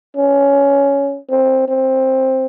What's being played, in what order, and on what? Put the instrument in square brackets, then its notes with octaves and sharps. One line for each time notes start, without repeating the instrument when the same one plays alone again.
[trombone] C#4
C4
C4